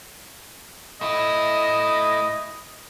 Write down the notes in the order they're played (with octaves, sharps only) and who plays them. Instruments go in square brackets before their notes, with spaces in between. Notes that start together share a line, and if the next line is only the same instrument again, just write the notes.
[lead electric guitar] A3 E4 [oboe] D#5